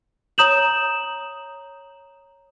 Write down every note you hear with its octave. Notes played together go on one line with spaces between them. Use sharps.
C#5 A#5 D#6 G6 E7 F#7